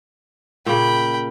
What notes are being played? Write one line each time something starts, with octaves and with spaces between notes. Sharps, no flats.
A#2 C#3 G5 B5